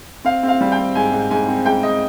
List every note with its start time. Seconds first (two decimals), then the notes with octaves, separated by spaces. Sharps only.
0.25 C4 F5
0.43 C4
0.48 F5
0.61 G3
0.72 G5
0.78 C4
0.95 G#2 G#5
1.12 G#2
1.31 G#2 G#5
1.48 C4
1.66 G#2 G5
1.83 G#2 D#5